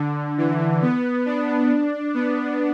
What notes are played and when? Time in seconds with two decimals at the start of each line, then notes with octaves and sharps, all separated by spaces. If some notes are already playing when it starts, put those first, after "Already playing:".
Already playing: D3
0.38 E3
0.82 B3
1.26 D4
2.14 B3